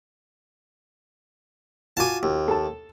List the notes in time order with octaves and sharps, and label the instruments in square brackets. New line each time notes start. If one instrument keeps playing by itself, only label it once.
[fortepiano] F4 F#4 D6 [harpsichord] G#5 A5
[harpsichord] D#2
[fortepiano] A4 A5